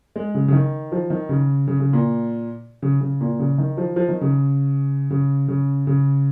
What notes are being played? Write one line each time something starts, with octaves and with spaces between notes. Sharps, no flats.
G#3
C#3
C#3
D#3
F3
D#3
C#3
C#3
C#3
A#2
C#3
C#3
A#2
C#3
D#3
F3
F3
D#3
C#3
C#3
C#3
C#3